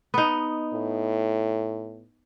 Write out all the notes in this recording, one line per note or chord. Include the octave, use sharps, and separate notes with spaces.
B3 D#4
A2